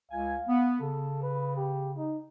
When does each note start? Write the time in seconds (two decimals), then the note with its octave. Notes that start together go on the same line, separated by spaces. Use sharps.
0.11 C#2 F5 G#5
0.48 B3
0.80 C#3 A4
1.22 B4
1.56 G4
1.97 D#4